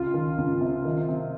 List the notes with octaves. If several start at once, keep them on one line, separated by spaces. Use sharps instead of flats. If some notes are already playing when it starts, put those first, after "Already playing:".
Already playing: C#2 F4
D#3
C#2
C3
D#3
C3